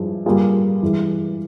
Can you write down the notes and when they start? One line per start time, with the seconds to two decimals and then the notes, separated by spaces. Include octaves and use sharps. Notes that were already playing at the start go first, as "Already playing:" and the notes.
Already playing: G2 F3 G#3 E4
0.26 G2 G3 A#3 F4 G#4
0.83 G2 E3 G#3